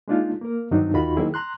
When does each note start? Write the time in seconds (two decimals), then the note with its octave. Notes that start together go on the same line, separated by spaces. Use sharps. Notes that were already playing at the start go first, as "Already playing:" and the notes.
0.08 G#3 A#3 D4 D#4 F4
0.41 A#3 A#4
0.71 G2 D#3 F#3 C4 D4 D#4
0.93 D#2 D#3 F4 F#4 B5
1.16 D#3 F#3 A#3 C4 E4 G#4
1.34 A#5 C6 F#6